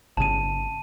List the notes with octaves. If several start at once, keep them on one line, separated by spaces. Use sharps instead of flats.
G1 C#3 A5 D#7